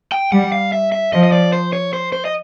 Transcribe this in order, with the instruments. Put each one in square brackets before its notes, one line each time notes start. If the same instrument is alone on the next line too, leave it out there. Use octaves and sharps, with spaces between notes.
[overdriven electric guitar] G5
[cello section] G3 [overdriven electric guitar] F#5
[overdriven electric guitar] F5
E5
E5
[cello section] F3 [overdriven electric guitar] D#5
[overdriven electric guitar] D#5
D5
C5
C#5
C5
C5
D#5